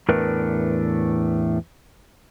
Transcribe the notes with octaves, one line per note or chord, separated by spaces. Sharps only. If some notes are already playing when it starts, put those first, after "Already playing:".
E2 A2 A3 D4 A#4 B4